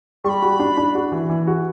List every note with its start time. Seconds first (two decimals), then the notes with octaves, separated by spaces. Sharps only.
0.24 G3 C#6
0.29 B5
0.42 F#4
0.60 D4
0.77 D4
0.95 F#4
1.12 E3
1.29 E3
1.47 F#4